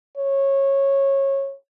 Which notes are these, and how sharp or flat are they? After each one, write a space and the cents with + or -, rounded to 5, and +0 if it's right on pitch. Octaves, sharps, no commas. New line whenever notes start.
C#5 -20